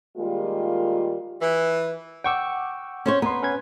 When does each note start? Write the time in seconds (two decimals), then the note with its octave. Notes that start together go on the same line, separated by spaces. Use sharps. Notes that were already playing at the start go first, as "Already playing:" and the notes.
0.17 D#3 G3 G#3 A#3 F4
1.42 E3
2.24 F#5 G5 C#6 D6 E6
3.06 C#4 C5 C#5
3.22 B3 A#5 C6
3.43 C#4 B4 G#6